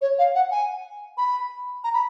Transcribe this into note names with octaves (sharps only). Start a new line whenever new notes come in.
C#5
F5
F#5
G#5
B5
A#5
B5